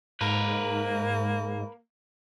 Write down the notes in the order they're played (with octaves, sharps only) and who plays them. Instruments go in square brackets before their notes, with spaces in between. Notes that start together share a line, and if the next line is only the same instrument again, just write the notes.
[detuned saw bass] G#2 [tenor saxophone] A#3 [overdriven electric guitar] A#4 B4